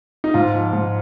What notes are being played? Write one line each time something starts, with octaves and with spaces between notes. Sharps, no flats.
D#4
G#2 F4
F3
G#2